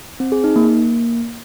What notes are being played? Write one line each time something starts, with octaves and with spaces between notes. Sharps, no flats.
C4
G#4
D#4
A#3
A#3